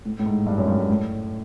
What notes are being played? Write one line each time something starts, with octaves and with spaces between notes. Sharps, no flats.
A2
A2
G#2
G2
F#2
G2
G#2
A2